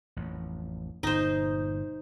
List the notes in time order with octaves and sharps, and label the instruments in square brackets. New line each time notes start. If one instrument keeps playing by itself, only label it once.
[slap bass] A1 F2
[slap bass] G1 A#2 [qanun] D#4 C5